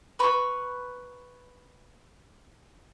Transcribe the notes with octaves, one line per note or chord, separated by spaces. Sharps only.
B4 A#5 B5 C#6